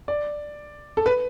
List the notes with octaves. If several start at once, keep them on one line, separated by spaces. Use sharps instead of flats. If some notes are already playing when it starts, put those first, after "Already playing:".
D5
A4
B4